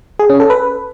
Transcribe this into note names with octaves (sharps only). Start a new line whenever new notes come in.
G#4
C#4
A4
B4